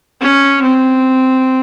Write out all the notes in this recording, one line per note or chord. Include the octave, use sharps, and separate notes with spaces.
C#4
C4